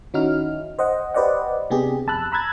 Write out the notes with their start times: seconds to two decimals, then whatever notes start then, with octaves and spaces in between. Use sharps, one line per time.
0.14 D#3 C#4 D#4 E4 F#4 F6
0.79 C5 D#5 F#5
1.14 G4 B4 C5 D5 D#5 F#5
1.70 C3 B3 D4 G4 G#4
2.07 F2 A5 B5 E6 F#6
2.32 A#5 B5 E6 F#6 G#6 A6